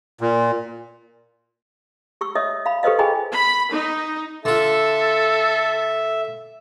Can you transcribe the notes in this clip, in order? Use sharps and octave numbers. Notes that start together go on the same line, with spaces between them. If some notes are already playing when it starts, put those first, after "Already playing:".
A#2
G4 C#6 E6
C#5 D#5 E5 D#6 E6
F5 B5
G4 A4 B4 C5 D#5 F5
F4 G#4 D#5 G5 G#5 B5
B5
D#4
D3 F4 A4 E5